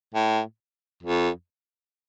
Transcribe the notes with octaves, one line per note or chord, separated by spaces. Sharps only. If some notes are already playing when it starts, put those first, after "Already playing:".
A2
F2